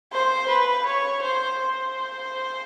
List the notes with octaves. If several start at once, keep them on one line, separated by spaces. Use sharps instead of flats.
C5
B4
C#5
C5
C5